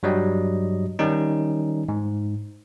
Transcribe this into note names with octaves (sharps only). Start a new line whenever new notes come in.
G2 F#3 G3 D#5
D#3 G3 C#4 D#4
G#2